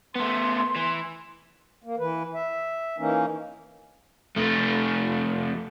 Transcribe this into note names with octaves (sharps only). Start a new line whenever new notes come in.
A3 B3 C6
E3
A#3
E3 B4
E5
E3 A#3 C#4 D#4
F2 A3